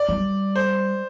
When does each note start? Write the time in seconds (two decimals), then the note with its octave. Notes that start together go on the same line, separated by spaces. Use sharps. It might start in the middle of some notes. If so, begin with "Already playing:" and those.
Already playing: D5
0.09 G3
0.56 C5